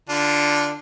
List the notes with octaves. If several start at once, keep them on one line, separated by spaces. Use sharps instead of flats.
D3 D4 F4